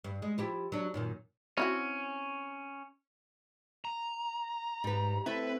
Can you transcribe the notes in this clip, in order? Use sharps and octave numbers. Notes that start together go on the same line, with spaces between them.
G2
G#3
F3 E4 G4
F#3 D4
F#2 A#2 D#3
C4 C#4 E4 F#4
A#5
G#2 G3 B4
A3 C4 E4 B4